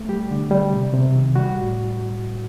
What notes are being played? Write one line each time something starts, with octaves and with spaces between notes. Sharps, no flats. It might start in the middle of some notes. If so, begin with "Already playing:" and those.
Already playing: A3
G3 G4
D3
G3
C3
C3
D#3
G3 F#4
A2